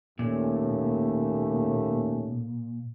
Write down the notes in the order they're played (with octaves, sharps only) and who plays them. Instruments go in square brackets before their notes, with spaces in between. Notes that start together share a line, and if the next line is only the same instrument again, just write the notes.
[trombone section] D#2 A3 C#4 [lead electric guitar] A#2